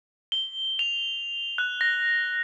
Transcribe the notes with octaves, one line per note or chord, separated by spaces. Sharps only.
G7
F7
F#6
A#6